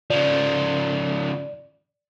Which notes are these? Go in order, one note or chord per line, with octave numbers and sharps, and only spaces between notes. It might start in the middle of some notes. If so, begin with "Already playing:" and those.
C#3 F3 D5